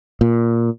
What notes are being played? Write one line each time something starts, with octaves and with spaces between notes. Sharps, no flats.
A#2